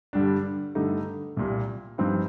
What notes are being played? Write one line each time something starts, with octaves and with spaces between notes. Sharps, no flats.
G2 D3 G3 D4
G2 D3 A3 D#4
C2 A#2 G3
G2 F3 C4 D#4